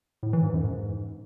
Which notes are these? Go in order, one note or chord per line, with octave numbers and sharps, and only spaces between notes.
A2
E3
G#2
F#2
G#2